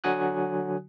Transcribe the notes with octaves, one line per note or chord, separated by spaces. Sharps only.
D3 F#3 F#4 G#5 D#6 F#6